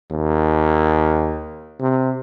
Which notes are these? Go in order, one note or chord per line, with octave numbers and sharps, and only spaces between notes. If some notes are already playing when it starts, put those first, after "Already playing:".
D#2
C3